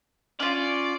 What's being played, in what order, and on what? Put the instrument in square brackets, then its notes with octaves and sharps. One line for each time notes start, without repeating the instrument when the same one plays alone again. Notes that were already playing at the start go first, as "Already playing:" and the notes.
[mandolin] C#4 F4 [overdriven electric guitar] D5